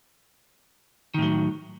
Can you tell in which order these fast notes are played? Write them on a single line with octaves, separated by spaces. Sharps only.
D#3 A2 F#3